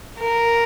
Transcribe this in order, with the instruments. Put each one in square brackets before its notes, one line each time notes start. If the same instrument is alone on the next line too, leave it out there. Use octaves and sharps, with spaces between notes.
[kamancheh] A#4